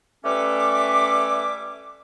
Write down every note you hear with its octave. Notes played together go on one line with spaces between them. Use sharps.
G3 A3 C#4 B4 E5 D6